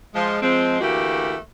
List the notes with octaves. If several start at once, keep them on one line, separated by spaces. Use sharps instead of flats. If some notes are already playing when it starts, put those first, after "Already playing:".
F3 G#3
F3 G#3 C4
D2 E3 A3 A#3 F#4 G4